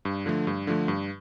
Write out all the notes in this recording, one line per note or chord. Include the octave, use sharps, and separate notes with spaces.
G2
D3 F3 A3
G2
D3 F3 A3
G2